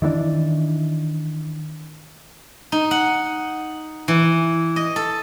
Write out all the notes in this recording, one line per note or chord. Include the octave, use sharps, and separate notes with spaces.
D#3 E3 G3 D4
D#4
F#5
E3
D#5
A4